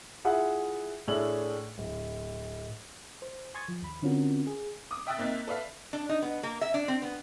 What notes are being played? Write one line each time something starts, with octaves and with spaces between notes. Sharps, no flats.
E4 F4 G#4 E5 F#5
A2 A3 D4 G#4 F#7
D1
C5
G#5 C6 C#6 D#6 G#6 A6
F3
D#2 B5
D3 C4 C#4 F4 F#4 A#4
G#4
D6 D#6
E5 G5 D#6 E6 F#6 A6
A#3 C4 D#4 E5
A4 B4 D5 E5 F5
D4
D#4
B3
A#3
E5
D4
C4
B3